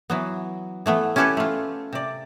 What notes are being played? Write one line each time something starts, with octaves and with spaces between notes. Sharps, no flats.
E3 F#3 B3
E3 A3 B3
C#4 E4 G4 A4 B4 C#5
A3 F4
C3 D5